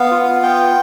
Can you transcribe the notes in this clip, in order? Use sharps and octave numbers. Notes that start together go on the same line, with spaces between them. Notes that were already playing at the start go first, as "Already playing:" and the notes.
Already playing: B3 F5
F4
B3 G5